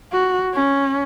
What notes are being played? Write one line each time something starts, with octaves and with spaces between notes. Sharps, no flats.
F#4
C#4